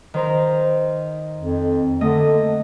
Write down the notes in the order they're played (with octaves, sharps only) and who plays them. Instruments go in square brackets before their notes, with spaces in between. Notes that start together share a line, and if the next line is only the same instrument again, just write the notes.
[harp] D#3 C5 A#5
[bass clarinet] F2
[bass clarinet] D3 [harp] A3 A#3 D#5